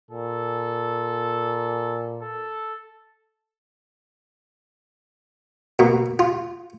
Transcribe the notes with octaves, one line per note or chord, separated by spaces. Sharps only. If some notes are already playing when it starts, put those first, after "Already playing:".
A#2 A4
A4
B2 A#3
F4